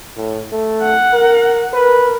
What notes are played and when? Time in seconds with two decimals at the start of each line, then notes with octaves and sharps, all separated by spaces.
0.17 A2
0.52 A3
0.82 F#5
1.13 A#4
1.73 A#4 B4